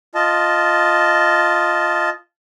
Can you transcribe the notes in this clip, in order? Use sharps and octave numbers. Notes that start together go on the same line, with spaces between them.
F4 D#5 A5